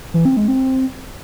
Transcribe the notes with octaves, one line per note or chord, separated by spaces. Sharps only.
E3
C4
G#3
C4